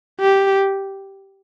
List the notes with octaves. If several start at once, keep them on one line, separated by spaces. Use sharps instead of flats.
G4